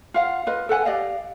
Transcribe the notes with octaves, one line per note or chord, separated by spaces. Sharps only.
F4 F5 F#5
F4 B4 D#5
A4 B4 F#5 G#5
G4 D5 D#5 F5